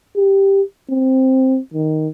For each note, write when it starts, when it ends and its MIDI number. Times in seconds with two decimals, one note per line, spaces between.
0.16 0.62 67
0.90 1.59 60
1.74 2.08 51